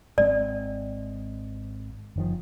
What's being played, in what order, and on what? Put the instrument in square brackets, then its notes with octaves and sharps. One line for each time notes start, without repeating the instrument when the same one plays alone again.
[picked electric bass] G#1 G#3 C4 [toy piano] D5
[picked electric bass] F#1 D#3 F3